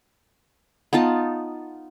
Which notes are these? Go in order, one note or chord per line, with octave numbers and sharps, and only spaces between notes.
B3 D#4 F4 A5